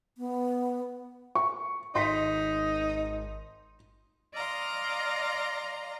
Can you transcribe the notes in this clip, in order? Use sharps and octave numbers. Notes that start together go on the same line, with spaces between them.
B3
C#6
G#1 D#4 C6 B6
D5 D#5 F5 A#5 C6